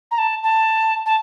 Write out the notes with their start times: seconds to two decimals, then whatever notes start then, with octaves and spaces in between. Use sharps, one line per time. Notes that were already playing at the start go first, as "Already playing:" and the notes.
0.11 A#5
0.18 A5
0.43 A5
1.05 A5